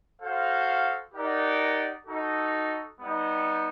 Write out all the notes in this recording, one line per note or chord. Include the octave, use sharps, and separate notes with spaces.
F#4 A4 C5 F5
D#4 G4 A#4 D5 F#5
D#4 F#4 A4
G3 B3 D#4